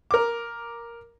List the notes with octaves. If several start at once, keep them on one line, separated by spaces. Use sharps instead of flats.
A#4 D6